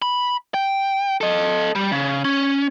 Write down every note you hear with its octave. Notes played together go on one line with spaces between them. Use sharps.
B5
G5
A4 D#5
G3
C#3
C#4